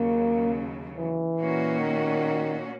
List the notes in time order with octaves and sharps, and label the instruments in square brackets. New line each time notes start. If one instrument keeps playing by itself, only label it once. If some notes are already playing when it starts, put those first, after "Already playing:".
Already playing: [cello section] D#2 C#3 F#3 [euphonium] A#3
[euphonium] E3
[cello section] A#2 A#3 C#4 F#4
[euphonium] D#3